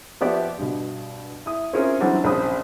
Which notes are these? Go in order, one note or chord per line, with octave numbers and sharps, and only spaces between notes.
F3 B3 G4 D5 E5
G2 B2
E4 D#6
C4 C#4 E4 F4 G#4 A#4
E3 F#3 G3 C4 D4 F#4
A#1 C#3 C4 B5 D#6